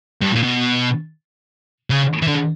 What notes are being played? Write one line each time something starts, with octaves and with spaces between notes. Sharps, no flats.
G2
A#2
B2
C#3
E3
D3